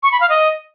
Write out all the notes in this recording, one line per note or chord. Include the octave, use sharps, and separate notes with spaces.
C#6
B5
F5
D#5